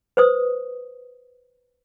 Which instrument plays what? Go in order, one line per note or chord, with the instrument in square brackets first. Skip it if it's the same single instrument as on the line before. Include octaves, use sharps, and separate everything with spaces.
[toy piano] B4 C5 D#6